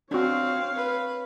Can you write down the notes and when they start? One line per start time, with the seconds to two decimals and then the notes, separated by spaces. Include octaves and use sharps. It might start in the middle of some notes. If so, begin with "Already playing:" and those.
0.11 C4 D4 F#4 C#5 F5
0.76 B4